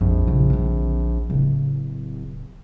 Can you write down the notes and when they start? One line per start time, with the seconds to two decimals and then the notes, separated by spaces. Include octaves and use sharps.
0.01 A#1 F2
0.27 A#2 C#3
0.50 D3 C4
1.30 D1 C#3